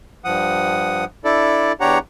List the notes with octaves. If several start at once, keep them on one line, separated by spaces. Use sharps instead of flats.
G2 F3 F#5 D#6
D4 E4 A4 D5
E2 D4 G4 C#5 F#5 A#5